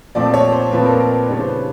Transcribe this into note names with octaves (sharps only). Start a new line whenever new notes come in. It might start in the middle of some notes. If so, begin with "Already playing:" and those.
A#2 F3 A3 C4 D5
C#5
C5
A#2 F3 A3 C4 B4
A#4
A#4
B4
C#3 E3 G3 B3 D4 C#5
C5
B4